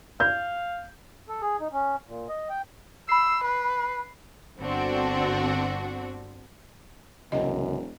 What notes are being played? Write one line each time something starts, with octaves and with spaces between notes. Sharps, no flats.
F5 G6
A4
G#4
D#4
C#4
A#2
D#5
G5
B5 E6 C7
B4
G1 D3 C4 D4 F#4
E1 C2 F#2 C#3 E3 D#5